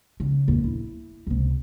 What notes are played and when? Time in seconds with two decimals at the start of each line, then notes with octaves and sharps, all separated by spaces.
0.20 C#3
0.48 A#1 E2
0.64 E4
1.27 C#2 C3